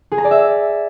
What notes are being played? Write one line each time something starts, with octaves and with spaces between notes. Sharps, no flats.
G#4
A#5
D5
E5